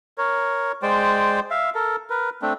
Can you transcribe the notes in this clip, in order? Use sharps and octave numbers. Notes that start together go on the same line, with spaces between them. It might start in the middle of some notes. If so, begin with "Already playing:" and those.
A#4 C#5
G#3 C5 D5 G5
E5 F5
A4 A#4
A#4 B4
A3 C4 D4